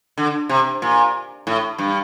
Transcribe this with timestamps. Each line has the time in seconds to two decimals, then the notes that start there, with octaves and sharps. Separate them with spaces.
0.18 D3
0.49 C3
0.82 A#2
1.47 A2
1.79 G2